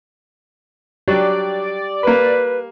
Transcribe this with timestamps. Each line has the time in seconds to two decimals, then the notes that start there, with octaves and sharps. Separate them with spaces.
1.08 F#3 D4 G4 D5
2.03 A#3 B4 B5